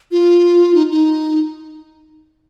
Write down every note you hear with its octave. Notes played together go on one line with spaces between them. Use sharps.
F4
D#4
D#4